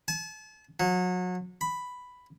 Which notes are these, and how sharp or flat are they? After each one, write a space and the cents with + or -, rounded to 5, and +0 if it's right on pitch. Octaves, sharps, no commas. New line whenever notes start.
A5 -40
F#3 -30
B5 +5